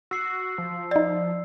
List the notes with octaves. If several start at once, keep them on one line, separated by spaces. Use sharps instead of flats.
F#4 E6 C7
F3
D#4 D5 A6